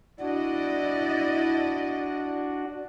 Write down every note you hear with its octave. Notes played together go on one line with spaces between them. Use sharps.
D4 E4 F#4 D5 D#5